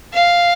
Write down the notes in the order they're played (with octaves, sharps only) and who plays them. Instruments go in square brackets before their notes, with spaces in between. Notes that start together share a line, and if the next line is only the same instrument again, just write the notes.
[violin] F5